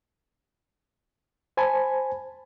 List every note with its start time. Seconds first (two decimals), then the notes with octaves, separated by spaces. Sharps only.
1.57 C5 G#5 A5 B5